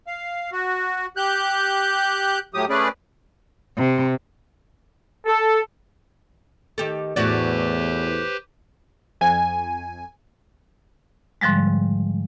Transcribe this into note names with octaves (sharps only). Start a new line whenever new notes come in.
F5
F#4
G4 F#6 G6
A2 F#3 G4 D#6
A3 C#4 G#4 B4 D5
C3
A4
D#3 G4 A4
E2 A2 F#4 G4 B4 C5 D5
F2 G#5
G#2 D3 F3 G3 G#3